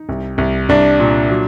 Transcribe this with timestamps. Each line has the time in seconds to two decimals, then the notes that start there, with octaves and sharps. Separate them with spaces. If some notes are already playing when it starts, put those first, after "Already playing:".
Already playing: D#4
0.09 C2
0.38 C2
0.69 C2 D4
1.00 A#2
1.30 F#3